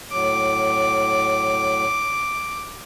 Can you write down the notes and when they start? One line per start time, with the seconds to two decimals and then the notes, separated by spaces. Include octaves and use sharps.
0.12 A2 F#3 D6